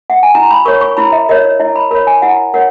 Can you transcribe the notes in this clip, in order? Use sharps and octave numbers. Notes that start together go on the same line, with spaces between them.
F#5
G#5
E4 A#5
B5
A#4 C#5 C#6
C#6
E4 B5
E5
A#4 C#5 D#5
C#5
E4 D#5
B5
A#4 C#5 B5
G#5
E4 F#5
A#4 C#5 F#5